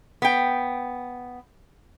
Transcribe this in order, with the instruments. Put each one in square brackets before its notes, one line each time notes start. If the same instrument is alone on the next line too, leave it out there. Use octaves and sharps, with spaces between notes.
[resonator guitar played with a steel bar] B3 G5